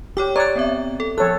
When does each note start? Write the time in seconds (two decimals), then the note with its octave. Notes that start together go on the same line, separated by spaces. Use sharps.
0.17 G4 C#5 G5 D6
0.36 C#5 D5 A#5 F#6
0.56 B3 C4 E5
1.00 A4
1.18 F3 A4 C#5 F#6